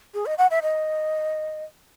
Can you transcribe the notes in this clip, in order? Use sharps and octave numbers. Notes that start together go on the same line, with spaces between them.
G#4
D#5
F#5
E5
D#5